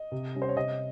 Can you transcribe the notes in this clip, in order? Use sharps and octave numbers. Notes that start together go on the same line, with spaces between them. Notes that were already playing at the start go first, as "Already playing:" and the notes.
Already playing: D#5
C3
G3 C#4
C5
C#5
C3 D#5